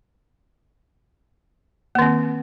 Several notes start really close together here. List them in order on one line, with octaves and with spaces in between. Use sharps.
A#3 D#3 C4